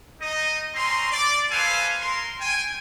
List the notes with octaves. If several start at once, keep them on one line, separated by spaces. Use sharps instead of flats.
D#4 D#5
C4 C#4 A#5 C6
D5
A4 B4 C5 F5 G#5
A#4 C6
G5 G#5